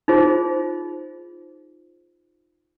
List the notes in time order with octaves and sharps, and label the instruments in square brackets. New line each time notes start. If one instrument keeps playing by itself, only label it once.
[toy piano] D#4 F4 G#4 C5